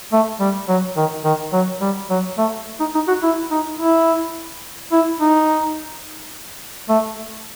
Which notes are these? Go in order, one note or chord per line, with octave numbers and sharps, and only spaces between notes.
A3
G3
F#3
D#3
D#3
F#3
G3
F#3
A3
D#4
D#4
F#4
E4
D#4
E4
E4
D#4
A3